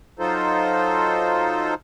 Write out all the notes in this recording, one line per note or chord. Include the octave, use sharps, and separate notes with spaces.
F#3 D#4 F4 A4 C5